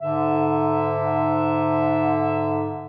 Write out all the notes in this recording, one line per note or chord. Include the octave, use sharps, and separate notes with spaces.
G#2 D3 E5